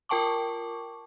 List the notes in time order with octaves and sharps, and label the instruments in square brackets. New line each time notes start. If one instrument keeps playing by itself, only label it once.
[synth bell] F4 A#4 G5 A5 C#6 D6